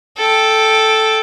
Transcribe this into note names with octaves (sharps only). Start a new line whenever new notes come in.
A4 G5